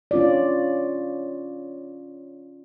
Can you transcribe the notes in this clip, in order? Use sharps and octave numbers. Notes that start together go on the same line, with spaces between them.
C#4 F4 D5